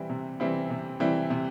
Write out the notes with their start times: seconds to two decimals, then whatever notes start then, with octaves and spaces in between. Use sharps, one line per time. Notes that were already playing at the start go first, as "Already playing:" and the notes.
Already playing: E3 G3 C4 E4
0.10 C3
0.40 E3 G3 C4 E4
0.70 C3
1.00 E3 G3 C4 E4
1.30 C3